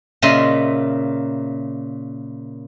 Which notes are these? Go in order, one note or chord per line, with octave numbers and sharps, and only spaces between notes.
A#2 C#3 D#5 E5 C6